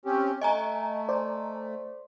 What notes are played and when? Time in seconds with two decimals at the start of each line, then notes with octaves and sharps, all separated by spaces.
0.05 C4 C#4 G4
0.41 A3 D#5 G#5 A#5
1.09 C5 D5